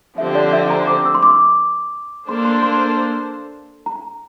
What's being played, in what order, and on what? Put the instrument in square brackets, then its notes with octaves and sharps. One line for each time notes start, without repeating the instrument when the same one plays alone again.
[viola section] D3 F3 C4 G4 C5 [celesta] E5
[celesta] D5
E5
A#5
D6
E6
C6
D6
[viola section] A#3 D4 A4 C5 [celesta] C6
[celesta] C6
C6
A#5